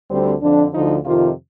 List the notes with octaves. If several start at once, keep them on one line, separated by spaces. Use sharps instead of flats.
D2 D3 G3 C4
F2 D3 F3 D4
D2 D3 F3 D#4
F2 C3 D#3 F4